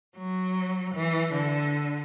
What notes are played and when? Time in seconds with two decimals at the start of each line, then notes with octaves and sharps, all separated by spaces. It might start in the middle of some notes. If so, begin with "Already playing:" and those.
0.17 F#3
0.95 E3
1.33 D3